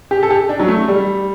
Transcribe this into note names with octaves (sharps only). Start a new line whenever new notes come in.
G4
A4
G4
D4
F#3
A3
G3